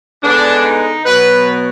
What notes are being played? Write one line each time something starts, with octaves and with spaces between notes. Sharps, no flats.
D3 G#3 B3 D4
D#4
B2 F#3 B3 B4